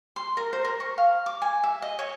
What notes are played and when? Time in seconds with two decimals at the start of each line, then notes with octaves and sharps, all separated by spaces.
0.16 C6
0.37 A#4
0.53 C5
0.65 A#4
0.80 C#6
0.98 F5
1.26 D6
1.42 G#5
1.63 E5
1.82 D#5
1.99 C#5